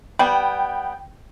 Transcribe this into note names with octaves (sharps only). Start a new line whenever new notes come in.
G3 B3 G5